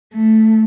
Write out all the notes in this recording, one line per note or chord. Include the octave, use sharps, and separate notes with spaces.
A3